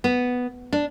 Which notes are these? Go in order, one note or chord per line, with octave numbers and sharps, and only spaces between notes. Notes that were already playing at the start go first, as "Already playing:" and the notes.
B3
D4